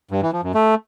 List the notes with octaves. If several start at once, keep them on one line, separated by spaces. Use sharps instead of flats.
G2
E3
F3
F#2
A3